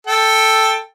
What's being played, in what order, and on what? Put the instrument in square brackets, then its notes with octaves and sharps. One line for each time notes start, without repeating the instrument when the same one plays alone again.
[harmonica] A4 G5